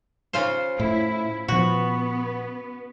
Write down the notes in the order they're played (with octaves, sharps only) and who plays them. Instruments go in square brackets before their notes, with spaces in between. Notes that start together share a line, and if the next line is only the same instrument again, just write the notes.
[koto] C#3 F4 C5
[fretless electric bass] A2 [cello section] E4
[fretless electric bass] A#2 F3 [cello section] B3 [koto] F#4